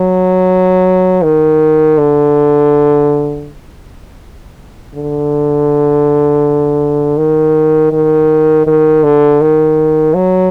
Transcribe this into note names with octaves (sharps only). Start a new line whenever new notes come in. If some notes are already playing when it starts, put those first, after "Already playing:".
Already playing: F#3
D#3
D3
D3
D#3
D#3
D#3
D3
D#3
F#3